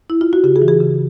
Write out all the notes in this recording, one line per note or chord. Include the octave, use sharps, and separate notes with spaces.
E4
F4
F#4
C#3 G4
G#4
E3
G#4
C#3